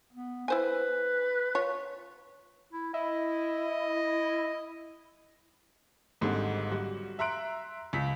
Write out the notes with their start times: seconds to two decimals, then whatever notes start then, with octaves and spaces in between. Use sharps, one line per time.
0.13 B3
0.48 E4 B4 C5 G#5
1.55 F4 C#5
2.73 E4
2.94 E4 D#5
6.21 G#1 G#2 D3 G3
6.71 F#3 G3 F#4
7.19 E5 A#5 C6 F#6 D7
7.93 C#2 B6